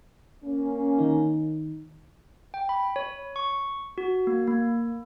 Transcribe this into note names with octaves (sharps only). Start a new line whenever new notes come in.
A#3 C#4
D#3 D#4
G5
B5
C#5
C#6
F#4
A#3
A#3